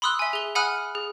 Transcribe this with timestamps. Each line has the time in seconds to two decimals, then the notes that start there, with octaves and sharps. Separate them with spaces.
0.02 B5 C6 D#6 E6 F#6
0.19 E5 G#5
0.33 G#4 G7
0.55 F#5 G#5 B5 D#6 F6 F#6
0.95 G#4